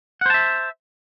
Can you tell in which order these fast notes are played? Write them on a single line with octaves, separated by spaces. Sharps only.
F#5 C5 A5 E5